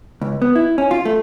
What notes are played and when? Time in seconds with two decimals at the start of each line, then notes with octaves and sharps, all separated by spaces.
0.21 C#2
0.42 B3
0.55 E4
0.78 C#4
0.91 F4
1.05 A3